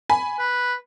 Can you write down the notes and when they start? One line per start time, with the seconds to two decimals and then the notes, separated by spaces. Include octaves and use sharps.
0.10 G#5 B5
0.39 B4